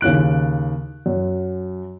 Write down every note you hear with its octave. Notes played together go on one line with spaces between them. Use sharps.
D#2 C#3 F#6 D7
F#2